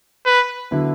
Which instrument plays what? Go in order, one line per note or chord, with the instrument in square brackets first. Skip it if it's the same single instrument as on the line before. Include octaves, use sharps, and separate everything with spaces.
[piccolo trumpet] B4
[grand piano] D3 F#3 B3 E4